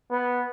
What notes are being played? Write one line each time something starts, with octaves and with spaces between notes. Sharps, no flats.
B3